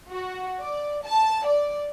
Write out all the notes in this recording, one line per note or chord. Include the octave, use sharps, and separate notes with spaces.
F#4
D5
A5
D5